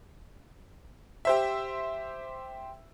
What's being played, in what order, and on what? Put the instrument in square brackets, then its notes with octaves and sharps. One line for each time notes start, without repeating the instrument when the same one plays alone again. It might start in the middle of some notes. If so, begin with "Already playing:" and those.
[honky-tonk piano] G4 C5 E5